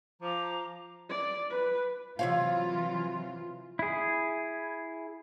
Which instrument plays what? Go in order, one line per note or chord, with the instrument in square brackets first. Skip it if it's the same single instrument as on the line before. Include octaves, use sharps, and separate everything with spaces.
[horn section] F3 [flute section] A#5 D6
[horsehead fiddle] D5
B4
[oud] C3 C#5 F5 [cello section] E3 F#3 F4
[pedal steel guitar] E4 G#4